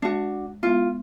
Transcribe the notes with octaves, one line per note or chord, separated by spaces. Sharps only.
G#3 D4 F#4
G#3 B3 E4 F4